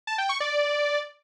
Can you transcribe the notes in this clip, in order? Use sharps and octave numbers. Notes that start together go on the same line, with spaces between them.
A5
G5
C#6
D5